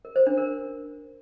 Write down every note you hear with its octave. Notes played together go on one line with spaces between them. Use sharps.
A#4
C5
D4
A#4